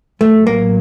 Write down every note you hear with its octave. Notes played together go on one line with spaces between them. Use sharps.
A1 A2 F#3 A3
A#3